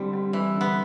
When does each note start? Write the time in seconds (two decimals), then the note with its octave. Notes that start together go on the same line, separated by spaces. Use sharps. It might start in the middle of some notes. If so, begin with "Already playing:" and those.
Already playing: D3 G3 C4 G4
0.13 G3
0.33 E3 G3
0.54 D3
0.61 B3